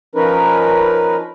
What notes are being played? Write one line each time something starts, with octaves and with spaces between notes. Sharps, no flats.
F3 C#4 D#4 A#4 B4